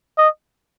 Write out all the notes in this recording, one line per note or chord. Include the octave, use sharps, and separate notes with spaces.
D#5